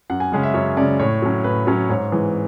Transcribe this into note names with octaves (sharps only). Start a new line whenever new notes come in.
F#2 F#5
G#5
C#3 G#3 C#4
E5
F#2 C#5
C#3 G#3 C#4 D5
A2 C#5
F#3 C#4
A2 B4
F#3 C#4
G#2 C#5
E3 G#3